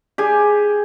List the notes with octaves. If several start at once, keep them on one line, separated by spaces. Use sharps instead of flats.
G4 G#4 G#5